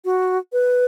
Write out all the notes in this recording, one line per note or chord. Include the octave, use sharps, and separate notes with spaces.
F#4
B4